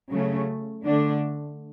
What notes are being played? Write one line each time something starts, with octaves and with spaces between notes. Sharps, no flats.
C#3 F#3 A3 C#4
D3 A3 D4